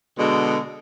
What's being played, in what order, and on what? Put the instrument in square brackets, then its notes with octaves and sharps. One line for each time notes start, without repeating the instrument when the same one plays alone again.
[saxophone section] B2 D3 G#3